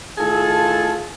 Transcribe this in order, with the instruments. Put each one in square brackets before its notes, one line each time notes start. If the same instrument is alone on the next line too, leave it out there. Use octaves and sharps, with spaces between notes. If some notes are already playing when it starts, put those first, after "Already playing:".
[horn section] A2 D#3 F4 G#4 A4 A5